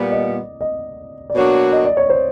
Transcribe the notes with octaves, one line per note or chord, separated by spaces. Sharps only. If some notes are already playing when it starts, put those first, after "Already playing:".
Already playing: A#2 G3 B3 D5
D#5
D#5
D5
B2 F#3 A#3 D4 F#4 C#5
D#5
D5
C#5
C5